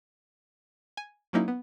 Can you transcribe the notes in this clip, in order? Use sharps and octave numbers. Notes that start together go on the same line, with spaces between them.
G#5
F#3 A#3 C#4 D#4 E4
B3